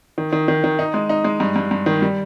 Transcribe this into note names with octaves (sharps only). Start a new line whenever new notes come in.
D#3
D#3
D#3
D#3
D#4
G#3
D#4
G#3
G2
G2
G2
D#3
G3